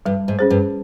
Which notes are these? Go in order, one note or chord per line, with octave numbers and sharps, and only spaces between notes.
G2 G3
G#2
C#4 G#4 C5
G2